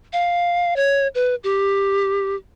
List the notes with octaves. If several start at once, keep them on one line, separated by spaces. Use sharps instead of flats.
F5
C#5
B4
G4